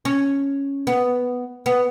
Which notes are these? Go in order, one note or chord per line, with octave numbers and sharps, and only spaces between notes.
C#4
B3
B3